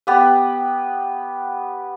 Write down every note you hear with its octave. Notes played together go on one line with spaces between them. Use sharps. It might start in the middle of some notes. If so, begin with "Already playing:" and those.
B3 G4 B4